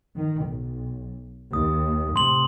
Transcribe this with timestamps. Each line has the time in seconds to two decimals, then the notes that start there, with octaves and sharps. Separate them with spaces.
0.16 D#3
0.45 B1
1.53 D#2 D#6
2.16 A2 C3 C6 F#7